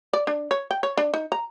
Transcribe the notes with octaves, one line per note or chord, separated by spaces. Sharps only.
D5
D4
C#5
G5
C#5
D4
D#4
A#5